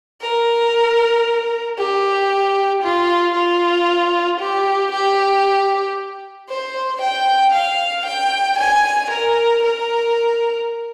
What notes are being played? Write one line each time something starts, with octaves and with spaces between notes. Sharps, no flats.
A#4
G4
F4
F4
G4
G4
C5
G5
F5
G5
G#5
A#4
A#4